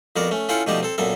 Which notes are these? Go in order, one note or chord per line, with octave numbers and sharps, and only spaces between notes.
F2 B3 F#4 A#4 D5
A3 C#4
C#4 E4 F4 A4 F#5 G5
B2 F3 A3 D#4 G4 D5
C4 A4
F#2 A#2 B3 A4 E5